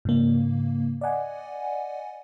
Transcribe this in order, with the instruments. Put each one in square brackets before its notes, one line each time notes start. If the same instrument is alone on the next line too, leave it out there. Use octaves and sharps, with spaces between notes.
[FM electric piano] G#2 C#3 A#3
D5 D#5 F#5 G#5